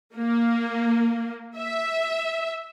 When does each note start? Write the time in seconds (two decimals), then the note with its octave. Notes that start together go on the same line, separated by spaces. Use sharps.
0.16 A#3
1.58 E5